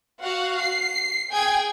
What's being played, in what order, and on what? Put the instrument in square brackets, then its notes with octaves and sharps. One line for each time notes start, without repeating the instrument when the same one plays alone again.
[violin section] F#4 F5 F#5
C7
G#4 G5 G#6